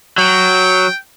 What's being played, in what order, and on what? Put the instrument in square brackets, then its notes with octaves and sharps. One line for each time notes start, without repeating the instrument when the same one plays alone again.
[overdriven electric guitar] F#3 [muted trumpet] G5